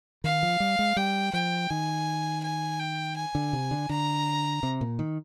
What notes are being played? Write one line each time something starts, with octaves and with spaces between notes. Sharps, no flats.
D#3 F5
F3
G3
G#3
G3 G5
F3 G5
D#3 G#5
G#5
G5
G#5
D3
C3
D3
D3 A#5
C3
A#2
D#3